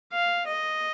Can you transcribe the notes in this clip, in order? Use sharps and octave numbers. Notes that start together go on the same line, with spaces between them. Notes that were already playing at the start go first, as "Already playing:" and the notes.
F5
D#5